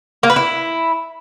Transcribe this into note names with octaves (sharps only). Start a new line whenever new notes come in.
A#3
B4
E4